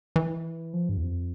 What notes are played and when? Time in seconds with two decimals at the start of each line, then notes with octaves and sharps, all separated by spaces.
0.16 E3
0.74 F3
0.89 G2
0.97 E2
1.03 F2